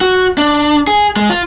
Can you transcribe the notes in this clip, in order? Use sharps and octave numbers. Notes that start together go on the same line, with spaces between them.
F#4
D4
G#4
G#3
F4